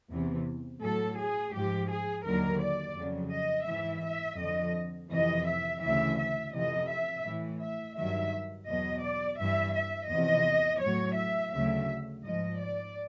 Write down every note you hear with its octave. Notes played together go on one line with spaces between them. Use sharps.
E2 C3 E3
A2 F#3 A4
G#4
G#2 F3 G4
G#4
D#2 D3 F#3 A#4
D5
F2 C#3 F#3
D#5
G#2 E3 E5
E5
F2 D3 F3 D#5
F2 C3 E3 D#5
E5
D2 C#3 E3 E5
E5
F2 C3 E3 D#5
E5
A2 E3
E5
G2 D#3 F#3 E5
E2 B2 F#3 D#5
D5
G2 E3 E5
E5
E2 C3 F3 D#5
A2 F#3 C#5
E5
D2 C#3 F#3 E5
G#2 F3 D#5
D5